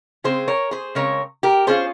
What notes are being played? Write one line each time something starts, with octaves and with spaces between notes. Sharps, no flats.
C#3 G#3 C4 G#4 C5
A#4 C#5
G#4 C5
C#3 G#3 C4 A#4 C#5
G4 A#4
G3 C#4 F4 G#4 C5